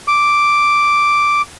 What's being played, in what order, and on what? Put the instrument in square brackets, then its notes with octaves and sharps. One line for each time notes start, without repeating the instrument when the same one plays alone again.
[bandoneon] D6